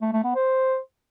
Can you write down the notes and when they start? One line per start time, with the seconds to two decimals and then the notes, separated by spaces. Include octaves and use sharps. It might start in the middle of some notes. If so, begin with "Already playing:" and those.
0.02 A3
0.13 A3
0.24 B3
0.35 C5